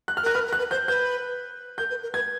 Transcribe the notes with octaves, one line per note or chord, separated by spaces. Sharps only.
F#6
F6
A#4 F#6
B4 F6
A#4
F#6
B4
C5 G6
B4 G6
A#4 G6
B4
A#4
B4 G#6